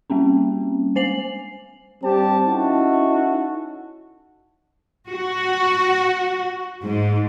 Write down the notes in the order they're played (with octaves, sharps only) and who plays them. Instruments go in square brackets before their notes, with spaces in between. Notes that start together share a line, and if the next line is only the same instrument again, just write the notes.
[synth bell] G3 A#3 C4 C#4
G#3 C5 G#5 C7 F#7
[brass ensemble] G2 G3 C4 G4 A5
C#4 D#4 E4 F#4 A4 A5
[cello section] F#4
G#2